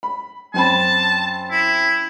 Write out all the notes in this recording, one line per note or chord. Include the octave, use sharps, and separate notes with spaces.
B5
F#2 C4 A5 B5
E4